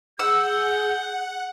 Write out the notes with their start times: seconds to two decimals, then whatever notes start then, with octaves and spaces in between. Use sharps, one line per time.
0.19 G#4 F#5 E6 G6